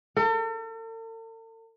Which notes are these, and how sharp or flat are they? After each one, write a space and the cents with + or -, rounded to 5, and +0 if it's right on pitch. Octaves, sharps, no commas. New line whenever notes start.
A4 +45